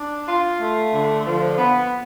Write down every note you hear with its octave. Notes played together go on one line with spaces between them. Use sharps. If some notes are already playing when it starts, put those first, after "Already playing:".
Already playing: D4
F4
A3
D3
F3
B3